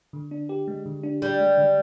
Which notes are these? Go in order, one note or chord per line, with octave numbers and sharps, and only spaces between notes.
D3
D4
G4
G#3
D3
D4
G3 G4
G#3
D3